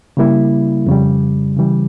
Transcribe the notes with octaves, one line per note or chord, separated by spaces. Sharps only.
C#3 G3 A#3 E4
F2 C#3 G3
C#3 E3 G3